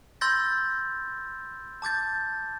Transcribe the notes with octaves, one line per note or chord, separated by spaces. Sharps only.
B5 C6 E6 G6 A6 A#6
A5 D6 G6 A6